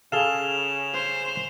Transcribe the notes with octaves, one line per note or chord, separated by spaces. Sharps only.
C#3 G#4 A4 F5 E7 F7 G7
C5